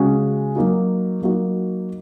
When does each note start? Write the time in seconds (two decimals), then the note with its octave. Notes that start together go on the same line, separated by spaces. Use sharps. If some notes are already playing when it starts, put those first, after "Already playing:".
Already playing: C#3 G#3 C#4 F#4
0.56 F#3 A#3 D#4 F#4
1.22 F#3 A#3 D#4 F#4